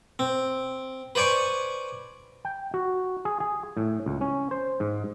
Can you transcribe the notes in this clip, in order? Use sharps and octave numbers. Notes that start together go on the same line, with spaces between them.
C4
B4 C5 D5 G#5 C#6
G5
F#4
G#4
G#4
A2
C#2
C#4
C5
G#2